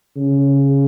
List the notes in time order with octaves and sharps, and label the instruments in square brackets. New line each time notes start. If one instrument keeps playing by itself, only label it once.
[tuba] C#3